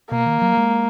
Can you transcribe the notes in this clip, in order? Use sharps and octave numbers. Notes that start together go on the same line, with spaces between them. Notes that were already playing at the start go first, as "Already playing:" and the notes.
B2 A#3
D#3
F#3
G#3